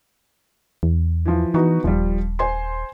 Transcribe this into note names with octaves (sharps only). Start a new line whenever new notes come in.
E2
E3 F3
E3 B3 D#4 F#4
D#1 F3 G3
C5 G#5 C6